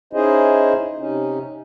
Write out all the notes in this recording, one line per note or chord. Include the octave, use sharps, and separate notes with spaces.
C#4 D#4 E4 G#4 C5 D#5
C3 C#4 D#4